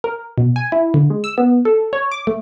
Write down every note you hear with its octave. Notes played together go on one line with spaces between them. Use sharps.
A#4
B2
G#5
E4
D3
G#3
E6
B3
A4
C#5
D6
A3